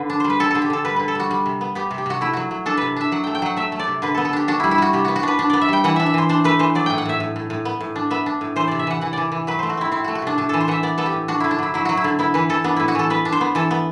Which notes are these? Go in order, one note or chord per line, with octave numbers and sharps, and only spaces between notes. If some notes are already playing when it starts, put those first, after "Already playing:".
Already playing: D3 B4
D4
G3 C5
B4
D3 A4
D3 A4
G4
D3 A4
G3 B4
D3 B4
A4
G3 F#4
G3
C3
B3
B3 G4
C3
G4
C3 F#4
A3 E4
F#3 F#4
F#3
D4 A4
C3 B4
D4 E5
F#3 F#5
A3 G5
G5
F#3 F#5
A3 E5
A3
D5
C3
D3 B4
B3 A4
A4
D4 G4
D4 F#4
G3 E4
E4
G3 F#4
C3 G4
B3 F#4
F#4
D4 B4
D4
B3 D5
E5
G3 G5
E3 F#5
D4 E5
E5
E3 C5
D4 C5
A3 B4
E3 C5
F#3 D5
A2 G5
F#5
A2 E5
A2
A2
A2
B3
A2
D4
B3 E5
D4
A2
E3 C5
C3 D5
E5
E3 F#5
E3 F#5
E3 D5
E3
F#3 B4
A3 C5
F#4
C4 E4
C4 E4
A3 F#4
F#4
C3 D4
A2 D4
E3 A4
C5
E3 E5 F#5
B3 D5
B3 A4
G4
A2
D4 F#4
D3 E4
D4
F#3 E4
F#3 E4
F#3 F#4
E4
D3
B3 E4
E3 B4
E3 A4
B3 D4
A2 E4
F#4
E3 A4
B3 B4
D4
C5
B3
E3 A4
B3